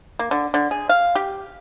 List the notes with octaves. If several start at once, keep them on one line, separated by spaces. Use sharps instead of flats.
A#3
D3
D3
G#4
F5
G4